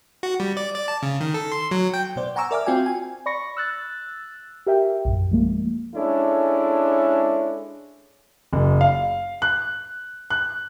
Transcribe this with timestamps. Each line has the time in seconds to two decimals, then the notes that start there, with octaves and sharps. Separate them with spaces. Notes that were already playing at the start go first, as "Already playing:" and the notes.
0.23 F#4
0.40 G3
0.57 D5
0.75 D5
0.88 A5
1.03 C#3
1.21 D#3
1.34 A4
1.52 C6
1.71 F#3
1.94 G5
2.16 B2 B3 C5 D5
2.36 F#5 G#5 A#5 C#6 D6 E6
2.51 A#4 D5 E5 G#5 D6 F6
2.66 C4 F4 F#4 G5 G#5
2.86 G#5
3.26 D5 B5 C#6 A#6 C#7
3.57 E6 F#6 A6
4.66 G4 A#4 E5 G5
5.05 A#1 F#2
5.31 F3 G#3 A#3
5.95 G#3 C#4 D4 E4 A4
8.53 F#1
8.81 F5
9.42 F#6
10.30 F#6